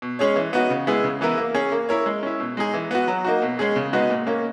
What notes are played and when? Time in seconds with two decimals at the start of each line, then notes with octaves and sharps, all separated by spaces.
0.02 B2
0.19 G#3 C#4 G#4 C#5
0.36 E3
0.53 B3 D#4 F#4
0.70 C#3
0.87 G#3 B3 E4 G#4
1.04 C#3
1.21 E3 B3 E4 A#4
1.37 A#3
1.54 C#4 G#4
1.72 A#3
1.89 E4 A#4 C#5
2.06 G#3
2.23 C#4 E4
2.40 B2
2.57 G#3 D#4 G#4
2.74 E3
2.91 B3 F#4
3.08 F#3
3.25 A#3 D#4 F#4
3.42 B2
3.59 G#3 C#4 G#4
3.76 C#3
3.93 G#3 B3 D#4 F#4
4.10 A#2
4.27 A#3 C#4